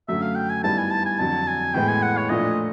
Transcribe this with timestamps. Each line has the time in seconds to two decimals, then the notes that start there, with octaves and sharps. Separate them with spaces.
0.08 F#2 D3 F#3 A3 E5
0.22 F5
0.35 G5
0.50 G#5
0.64 G2 D#3 G3 B3 E4 A5
0.78 G#5
0.91 A5
1.06 G#5
1.19 F2 D3 F#3 A5
1.47 G#5
1.74 A2 E3 G#3 B3 G5
1.88 G#5
2.03 F#5
2.17 C#5
2.30 A#2 F3 A3 D4 F4 D#5